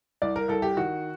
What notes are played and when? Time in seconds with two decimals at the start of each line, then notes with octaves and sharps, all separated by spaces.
0.22 C2 D5
0.36 A#4
0.48 C2 A4
0.62 G4
0.77 D#3 F#4